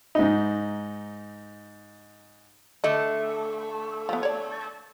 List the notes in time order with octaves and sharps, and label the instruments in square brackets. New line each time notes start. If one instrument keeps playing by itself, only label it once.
[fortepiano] G#2 D#4
[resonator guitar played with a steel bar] D3 A3 [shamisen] D#5
[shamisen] F3 B3
C#5 D5